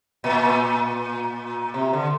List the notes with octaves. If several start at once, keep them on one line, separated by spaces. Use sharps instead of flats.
A#2
C3
D3